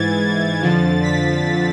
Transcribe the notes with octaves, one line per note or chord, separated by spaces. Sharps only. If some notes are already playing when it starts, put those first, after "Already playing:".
Already playing: G#2 E3 G#6 A6
F2 D3 F3
B6